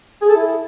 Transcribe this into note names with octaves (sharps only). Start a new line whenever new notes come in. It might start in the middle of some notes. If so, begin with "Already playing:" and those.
G#4
A4
E4